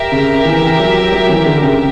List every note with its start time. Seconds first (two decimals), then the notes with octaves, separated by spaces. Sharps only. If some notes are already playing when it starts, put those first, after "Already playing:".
Already playing: G4 A#4 E5
0.12 C#3
0.45 E3
0.80 F#3
1.12 F#3
1.29 E3
1.46 D3
1.62 C#3